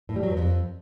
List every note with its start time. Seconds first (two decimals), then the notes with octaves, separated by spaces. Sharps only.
0.09 A2
0.16 G3
0.23 F#3
0.30 G2
0.37 F2